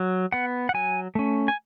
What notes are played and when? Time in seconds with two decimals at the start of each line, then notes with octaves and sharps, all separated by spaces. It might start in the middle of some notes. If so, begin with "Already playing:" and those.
Already playing: F#3
0.32 B3 F#5
0.69 F#5
0.74 F#3 G#5
1.15 A3 C#4
1.48 G#5